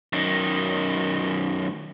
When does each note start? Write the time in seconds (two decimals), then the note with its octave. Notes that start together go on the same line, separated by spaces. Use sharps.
0.13 F#2 D#3